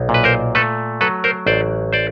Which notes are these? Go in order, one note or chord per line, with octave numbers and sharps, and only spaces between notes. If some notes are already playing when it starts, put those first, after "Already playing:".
Already playing: B1
A#2
B4
A#4 C5
A3 A4 B4
F#3 A4 B4
A#4 C5
A1 C5 D5
C5 D5